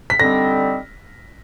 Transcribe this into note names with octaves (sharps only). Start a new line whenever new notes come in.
B6
D3 G3 C4 D#4 A#6